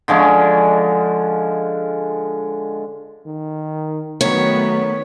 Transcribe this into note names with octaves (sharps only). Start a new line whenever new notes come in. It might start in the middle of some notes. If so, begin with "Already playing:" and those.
D3 F3 G#3 C#4
D#3
D#3 F#3 A3 B3 C#5